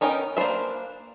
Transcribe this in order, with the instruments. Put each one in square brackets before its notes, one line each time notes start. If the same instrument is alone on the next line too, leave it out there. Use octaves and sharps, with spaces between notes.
[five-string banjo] B3 C#4 D#4 A#4 G5
A#3 D4 B4 C5 E5